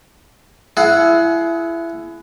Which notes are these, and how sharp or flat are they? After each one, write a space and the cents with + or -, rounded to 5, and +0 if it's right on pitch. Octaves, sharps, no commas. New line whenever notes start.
E4 +20 G#4 +30 F#5 -5